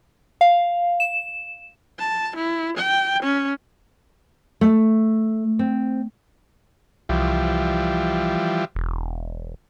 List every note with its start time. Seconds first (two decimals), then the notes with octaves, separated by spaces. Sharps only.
0.41 F5
1.00 E7
1.99 A5
2.36 E4
2.77 G5
3.23 C#4
4.61 A3
5.59 C4
7.09 C2 E3 F3 G3
8.75 E1